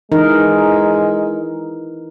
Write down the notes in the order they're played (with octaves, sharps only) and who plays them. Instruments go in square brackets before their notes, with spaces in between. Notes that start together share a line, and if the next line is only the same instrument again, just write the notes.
[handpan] E3 D#4 A#4 [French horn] G#3